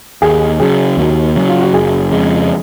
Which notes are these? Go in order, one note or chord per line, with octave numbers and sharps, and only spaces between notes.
D#2 G#4
C#3 F#3 G#4
D#2 F#4
C#3 F#3
F4
F#4
F#1 G#4
F2 C#3 G#3